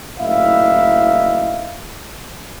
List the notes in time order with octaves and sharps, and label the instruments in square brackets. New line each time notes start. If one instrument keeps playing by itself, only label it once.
[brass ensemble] F#1 A2 D#4 E4 E5 F5